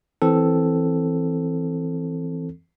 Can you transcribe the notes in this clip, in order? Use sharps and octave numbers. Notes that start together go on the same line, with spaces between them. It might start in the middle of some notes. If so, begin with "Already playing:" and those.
E3 C4 A4